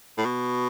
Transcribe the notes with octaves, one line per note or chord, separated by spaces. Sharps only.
A2
B2